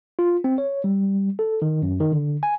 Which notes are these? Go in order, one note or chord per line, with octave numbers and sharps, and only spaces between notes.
F4
C4
C#5
G3
A4
D#3
F#2
D#3
D3
G#5